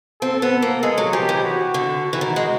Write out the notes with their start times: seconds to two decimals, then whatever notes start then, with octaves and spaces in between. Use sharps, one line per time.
0.21 C4 A4
0.42 B3
0.62 A#3
0.83 G#3 G#4
0.98 F#3
1.13 F3 G4
1.29 E3
1.44 F#4
1.74 D3
2.05 F#4
2.13 E3
2.21 D#3
2.36 G#3